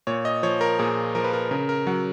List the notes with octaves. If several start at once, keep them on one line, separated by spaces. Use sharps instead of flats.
A#2 C#5
D#5
F3 C#5
A#4
A#2 G#4
F3 A#4
B4
A#4
C#3 A#4
A#4
F#3 F#5